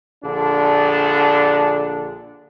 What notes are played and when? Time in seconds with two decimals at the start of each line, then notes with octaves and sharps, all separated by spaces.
0.24 A#1 D3 D4